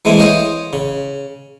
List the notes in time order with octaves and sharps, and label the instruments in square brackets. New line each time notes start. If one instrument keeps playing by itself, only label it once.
[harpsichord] E3 G#3 A3 C4 E4
C5 C#5 D#5 F5 G5
C#3